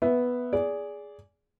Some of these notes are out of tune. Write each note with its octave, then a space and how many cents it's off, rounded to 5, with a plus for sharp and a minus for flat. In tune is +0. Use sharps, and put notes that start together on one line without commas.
B3 +0 E5 +0
G#4 +0 D5 -20